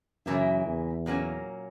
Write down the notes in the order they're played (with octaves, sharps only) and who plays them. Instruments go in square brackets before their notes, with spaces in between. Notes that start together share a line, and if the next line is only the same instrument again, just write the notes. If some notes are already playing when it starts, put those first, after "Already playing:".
[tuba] F#2 [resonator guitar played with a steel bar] C#3 E3 A#3 E4
[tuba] E2
[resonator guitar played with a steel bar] A#2 F#3 A#3 C#4